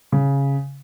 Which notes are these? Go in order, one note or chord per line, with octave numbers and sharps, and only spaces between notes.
C#3